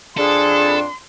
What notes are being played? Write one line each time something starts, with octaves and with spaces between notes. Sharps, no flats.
F2 D4 G#4 A4 C6